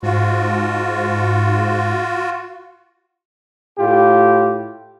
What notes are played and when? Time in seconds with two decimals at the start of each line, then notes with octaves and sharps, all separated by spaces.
0.03 G#2 F4 F#4
3.78 A2 F4 G4